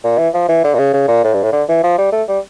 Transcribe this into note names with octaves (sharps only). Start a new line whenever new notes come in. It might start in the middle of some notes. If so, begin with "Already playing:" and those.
A#2
E3
F3
E3
D3
A#2
C#3
C#3
A#2
A2
G2
A2
D3
E3
F3
G3
A3
G3